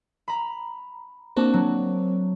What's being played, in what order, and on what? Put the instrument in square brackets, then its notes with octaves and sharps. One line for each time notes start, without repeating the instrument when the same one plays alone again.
[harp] A#5 B5
[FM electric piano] A#3 C4 D4 [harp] F#4 A5 D6
[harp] F#3